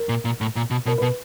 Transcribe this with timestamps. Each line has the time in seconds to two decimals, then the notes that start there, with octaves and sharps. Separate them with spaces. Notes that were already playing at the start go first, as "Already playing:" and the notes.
Already playing: A#4
0.09 A#2
0.25 A#2
0.41 A2
0.56 A#2
0.71 B2
0.86 B2 A#4
0.98 B2 B4